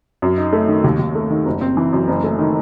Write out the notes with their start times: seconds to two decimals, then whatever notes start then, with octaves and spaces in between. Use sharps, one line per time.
0.22 F#2
0.38 D#4
0.53 A3
0.68 D#3
0.84 D#2
0.99 D#2
1.15 A3
1.31 D#3
1.46 F#1
1.61 C4
1.77 E3
1.93 F#2
2.08 F#1
2.24 A3
2.39 D#3